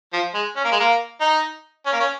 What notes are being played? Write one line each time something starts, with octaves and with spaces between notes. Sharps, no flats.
F3
G#3
C#4
A#3
G#3
A#3
D#4
C#4
A#3
C#4